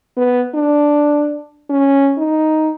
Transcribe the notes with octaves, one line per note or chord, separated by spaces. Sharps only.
B3
D4
C#4
D#4